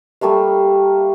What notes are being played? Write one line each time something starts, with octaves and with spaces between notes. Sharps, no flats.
G3 A3 A#3 F5